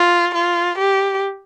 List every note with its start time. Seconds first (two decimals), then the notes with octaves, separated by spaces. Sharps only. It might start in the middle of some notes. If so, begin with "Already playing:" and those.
Already playing: F4
0.35 F4
0.79 G4